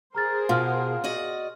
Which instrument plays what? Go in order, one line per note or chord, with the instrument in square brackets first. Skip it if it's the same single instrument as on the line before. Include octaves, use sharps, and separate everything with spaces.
[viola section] G#4 A#4 C5 [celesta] A#5 F6 A6
[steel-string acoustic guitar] B2 [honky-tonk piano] F4 F#5 [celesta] C6 F6
[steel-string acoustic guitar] F#4 D5 D#5